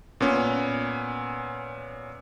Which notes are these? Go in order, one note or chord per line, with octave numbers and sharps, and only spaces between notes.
A#2 B3 C#4